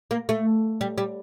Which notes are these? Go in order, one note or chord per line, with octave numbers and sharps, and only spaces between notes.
A#3
A3
G3
G3